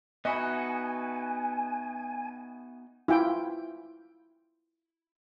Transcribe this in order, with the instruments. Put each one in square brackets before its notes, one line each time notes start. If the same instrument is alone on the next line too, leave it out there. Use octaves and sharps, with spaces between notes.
[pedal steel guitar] B3 D#4 F#4 [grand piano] D#5 E5 B5 [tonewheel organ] G#5
[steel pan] E4 F4 G5